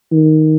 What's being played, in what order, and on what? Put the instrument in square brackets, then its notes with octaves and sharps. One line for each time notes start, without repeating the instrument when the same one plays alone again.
[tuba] D#3